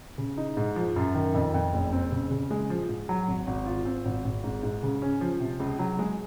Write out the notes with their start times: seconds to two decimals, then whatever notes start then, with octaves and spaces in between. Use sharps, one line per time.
0.18 C#3
0.37 D#4
0.57 G#2
0.76 F3
0.96 F#2
1.15 D#3
1.35 F2
1.54 F2
1.73 F#1
1.92 C4
2.12 C#3
2.31 C#3
2.51 G#3
2.70 F3
2.89 G#2
3.09 F#3
3.28 G#1
3.47 G#1
3.66 F4
3.85 C4
4.05 G#1
4.25 G#1
4.44 G#2
4.63 G#2
4.83 C#3
5.02 C#4
5.21 F3
5.40 C3
5.60 C#2
5.79 F#3
5.99 G#3